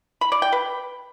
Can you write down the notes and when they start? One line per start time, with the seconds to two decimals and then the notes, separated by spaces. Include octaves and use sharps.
0.21 B5
0.32 D5
0.42 G5
0.52 B4